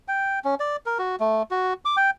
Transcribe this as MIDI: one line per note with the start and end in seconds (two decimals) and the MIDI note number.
0.08 0.39 79
0.45 0.55 61
0.60 0.76 74
0.86 0.98 70
0.99 1.16 66
1.20 1.43 57
1.51 1.73 66
1.85 1.96 86
1.97 2.10 79